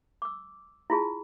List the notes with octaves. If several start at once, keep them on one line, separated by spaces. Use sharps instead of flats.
D6 E6
E4 F4 G#4 A5